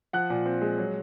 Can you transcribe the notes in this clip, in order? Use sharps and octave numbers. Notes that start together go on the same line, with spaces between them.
F3 F#5 F#6
A#2
C4
G#3
F#3